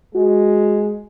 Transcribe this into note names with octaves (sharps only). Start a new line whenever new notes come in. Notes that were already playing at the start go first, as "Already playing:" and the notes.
G#3 F#4